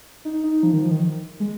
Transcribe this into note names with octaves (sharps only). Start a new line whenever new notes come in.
D#4
D#4
F3
D#3
F3
D#3
G#3